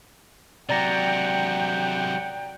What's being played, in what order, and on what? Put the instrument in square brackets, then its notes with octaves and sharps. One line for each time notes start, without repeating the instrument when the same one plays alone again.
[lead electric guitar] C3 F#3 [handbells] D5 A#5 A#6 [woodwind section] F#5 G5